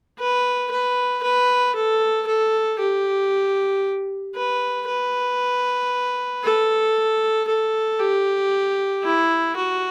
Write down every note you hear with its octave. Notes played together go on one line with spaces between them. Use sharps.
B4
B4
B4
A4
A4
G4
B4
B4
A4
A4
G4
E4
F#4